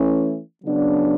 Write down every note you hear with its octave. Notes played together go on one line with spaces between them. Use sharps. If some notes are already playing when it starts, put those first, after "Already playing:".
Already playing: E3 A3 C#4
C#3 F#3 B3 D4